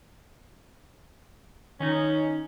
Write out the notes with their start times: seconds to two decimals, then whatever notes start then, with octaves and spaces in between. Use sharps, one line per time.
1.80 D#3 C#4 D#4